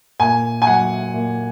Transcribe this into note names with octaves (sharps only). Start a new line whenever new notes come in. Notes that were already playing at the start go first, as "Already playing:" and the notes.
A#2 G#5
G#5
F#3 F#5
A#2